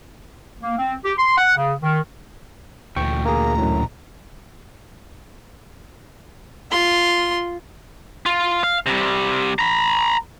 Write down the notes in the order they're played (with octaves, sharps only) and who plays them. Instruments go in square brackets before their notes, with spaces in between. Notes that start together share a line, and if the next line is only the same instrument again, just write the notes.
[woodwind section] A#3
C4
G4
C6
F#5
C#3
D#3
[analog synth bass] D2 [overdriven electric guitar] A#2 E3 [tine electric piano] G5 C#6
[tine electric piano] A#3 G#4 [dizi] A#5
[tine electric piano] F#2 A2
[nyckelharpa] F4 C6
[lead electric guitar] F4
F5
C3 G3
A#5 B5